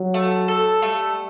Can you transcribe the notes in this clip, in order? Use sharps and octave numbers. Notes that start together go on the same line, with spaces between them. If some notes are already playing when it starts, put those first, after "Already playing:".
Already playing: F#3
A3
A4
G3 A3